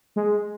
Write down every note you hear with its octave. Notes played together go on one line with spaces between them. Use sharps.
G#3